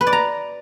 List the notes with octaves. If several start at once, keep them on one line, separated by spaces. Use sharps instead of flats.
B4
D5
A#5